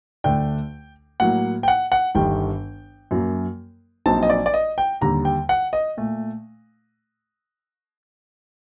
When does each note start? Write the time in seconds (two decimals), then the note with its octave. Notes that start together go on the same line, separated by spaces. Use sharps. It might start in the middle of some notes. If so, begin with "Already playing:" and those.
0.24 D2 D3 A3 D4 G5
1.20 A2 F#3 A#3 F#5
1.63 G5
1.68 F#5
1.92 F#5
2.15 G1 G2 D#3 G3 G5
3.11 F#2 F#3 A#3
4.06 A#1 A#2 F#3 C4 D#4 A5
4.23 D#5
4.30 D5
4.46 D5
4.54 D#5
4.78 G5
5.01 D#2 D3 G3 A#5
5.25 G5
5.49 F#5
5.73 D#5
5.97 A#2 A3